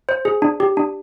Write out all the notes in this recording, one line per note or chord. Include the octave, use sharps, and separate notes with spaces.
C5
G#4
D4
G4
D4